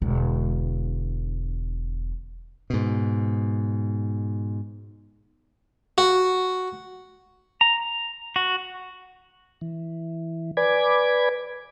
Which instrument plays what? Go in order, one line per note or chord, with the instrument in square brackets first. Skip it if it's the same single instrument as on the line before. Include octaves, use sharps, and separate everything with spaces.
[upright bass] E1 D3
[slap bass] G#2 B2
[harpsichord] F#4
[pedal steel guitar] A#5
F#4
[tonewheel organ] E3
B4 D5 G#5 B5 D6 G#6